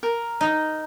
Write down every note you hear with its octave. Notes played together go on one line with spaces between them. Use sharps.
A#4
D#4